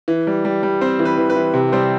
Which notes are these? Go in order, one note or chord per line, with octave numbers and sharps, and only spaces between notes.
E3
G3
G3
G3
C4 C5
E3
B4
E3
B4
E3
C3
G3 C4 C5